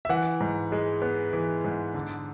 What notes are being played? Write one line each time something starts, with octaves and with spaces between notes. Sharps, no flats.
E5
E3 F#5
G#2
G#3
B3
E3
G#2
D3